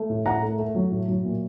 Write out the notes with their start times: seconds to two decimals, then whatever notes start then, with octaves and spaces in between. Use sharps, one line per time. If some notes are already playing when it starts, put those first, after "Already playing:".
Already playing: A3
0.10 A2
0.25 A2 F#5 A#5
0.42 A3
0.58 A3
0.75 F#3
0.91 A2
1.08 F#3
1.25 A#2